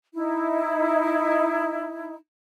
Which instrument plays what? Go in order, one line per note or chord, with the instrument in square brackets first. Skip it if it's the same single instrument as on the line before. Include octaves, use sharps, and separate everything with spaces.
[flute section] D#4 E4